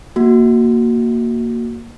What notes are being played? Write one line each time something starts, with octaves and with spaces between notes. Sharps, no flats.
A#3 F#4